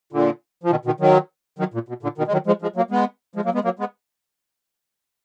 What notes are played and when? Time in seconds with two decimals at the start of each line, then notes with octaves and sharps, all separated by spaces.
0.13 A#2 D3
0.63 F3
0.70 B2 D#3
0.85 B2 D#3
1.00 D#3 F#3
1.59 D#3 F#3
1.74 A#2
1.89 B2
2.03 A#2 D3
2.18 B2 D#3
2.28 G#3
2.32 D#3 F#3
2.47 F3 G#3
2.62 F3 G#3
2.76 F#3 A#3
2.91 G#3 B3
3.35 F3 G#3
3.45 F#3 A#3
3.54 G#3 B3
3.64 F#3 A#3
3.79 G#3 B3